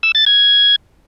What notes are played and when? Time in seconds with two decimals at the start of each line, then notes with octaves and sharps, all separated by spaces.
0.03 E6
0.15 A6
0.26 G#6